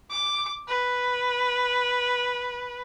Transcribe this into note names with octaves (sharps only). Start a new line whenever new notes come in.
D6
B4